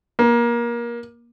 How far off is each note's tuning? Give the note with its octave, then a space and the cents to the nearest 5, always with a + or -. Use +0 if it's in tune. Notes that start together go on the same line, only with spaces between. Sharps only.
A#3 +25